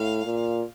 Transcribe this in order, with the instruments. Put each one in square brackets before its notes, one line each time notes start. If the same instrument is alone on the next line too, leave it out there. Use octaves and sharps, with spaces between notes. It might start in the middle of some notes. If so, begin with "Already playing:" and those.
Already playing: [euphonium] A2 [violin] F5
[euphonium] A#2